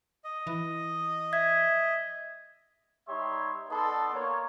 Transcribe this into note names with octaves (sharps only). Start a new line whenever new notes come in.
D#5
E3
E5 G#6
G3 D#4 G4 C#5 E5 C6
B3 D#4 A4 D5 A5 C6
A#3 C#5